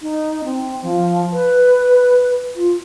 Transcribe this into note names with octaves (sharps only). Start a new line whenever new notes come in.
D#4
C4
F3
B4
F4